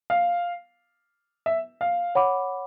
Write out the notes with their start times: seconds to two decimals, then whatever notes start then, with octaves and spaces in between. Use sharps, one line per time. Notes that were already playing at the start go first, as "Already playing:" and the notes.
0.10 F5
1.46 E5
1.81 F5
2.15 C#5 F#5 B5 D6